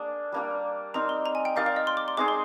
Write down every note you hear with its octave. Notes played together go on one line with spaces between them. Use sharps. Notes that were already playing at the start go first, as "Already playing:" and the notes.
Already playing: A#3 D4 G#4
G3 A#3 D4 G4
C4 D#4 A#4 A#5
C6
A#5
G#5
G5
D#4 G4 A#4 D5 F5
F5
D#5
C6
D6
C6
G#3 C4 D#4 G#4 D6
C6